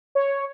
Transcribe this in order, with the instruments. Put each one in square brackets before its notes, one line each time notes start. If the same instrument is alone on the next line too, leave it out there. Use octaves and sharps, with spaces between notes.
[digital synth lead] C#5